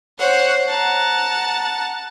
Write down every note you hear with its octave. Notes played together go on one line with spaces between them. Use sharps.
C5 C#5 F#5
F#5 A5 A#5